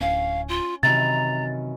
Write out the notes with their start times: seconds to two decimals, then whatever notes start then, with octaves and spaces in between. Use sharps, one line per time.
0.01 D1 C#4 F5
0.48 F4
0.83 F#2 C3 D#3 E3 A#5 A6